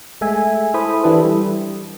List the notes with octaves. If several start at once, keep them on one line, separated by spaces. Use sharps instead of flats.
G#3 A3 E5 G#5
E4 A4 C5 B5 D#6
E3 D4 E4 G4 A4 B4
G3